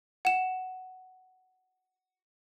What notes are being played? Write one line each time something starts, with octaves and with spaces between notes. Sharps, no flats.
F#5 E7